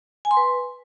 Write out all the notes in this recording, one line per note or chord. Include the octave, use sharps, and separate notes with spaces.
G#5
C6
B4